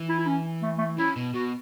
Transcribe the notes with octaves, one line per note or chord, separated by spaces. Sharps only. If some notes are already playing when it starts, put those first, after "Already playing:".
Already playing: E3
E4
E4
C#4
A3
A3
C#3 E4
B2
B2 F#4